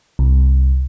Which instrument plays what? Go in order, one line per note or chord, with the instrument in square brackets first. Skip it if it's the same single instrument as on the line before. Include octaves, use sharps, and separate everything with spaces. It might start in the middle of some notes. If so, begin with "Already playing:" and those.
[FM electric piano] C2